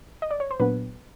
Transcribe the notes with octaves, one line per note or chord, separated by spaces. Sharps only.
D#5
D5
C#5
C5
A#2 F#3 B3 D4 B4